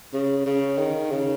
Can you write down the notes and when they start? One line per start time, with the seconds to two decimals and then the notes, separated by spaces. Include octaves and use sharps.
0.13 C#3
0.46 C#3
0.78 D#3
1.11 C#3